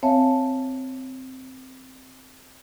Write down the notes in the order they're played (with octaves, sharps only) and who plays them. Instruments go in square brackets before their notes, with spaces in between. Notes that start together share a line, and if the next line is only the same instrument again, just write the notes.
[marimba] C4 C#5 E5 F5 G#5 A5